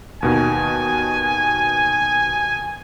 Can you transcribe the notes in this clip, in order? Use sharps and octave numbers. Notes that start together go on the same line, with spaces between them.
D#2 B2 D#3 G#5